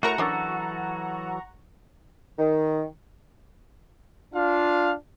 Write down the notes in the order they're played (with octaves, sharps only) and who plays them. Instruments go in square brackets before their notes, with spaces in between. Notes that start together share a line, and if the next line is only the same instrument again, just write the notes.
[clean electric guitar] A3 [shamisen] E4 A#4 C#5 [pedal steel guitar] F#4 [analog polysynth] F#5 A#5 C#6
[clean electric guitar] E3 F#3 A4 [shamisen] C#4 D4 A#4
[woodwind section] D#3
[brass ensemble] D4 F4 F5